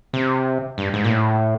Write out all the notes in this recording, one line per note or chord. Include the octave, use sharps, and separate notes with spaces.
C3
G2
G#2
A#2
A2